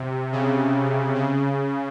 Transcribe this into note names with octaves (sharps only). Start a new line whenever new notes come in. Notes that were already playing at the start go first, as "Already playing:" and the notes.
Already playing: C3
C#3
C#3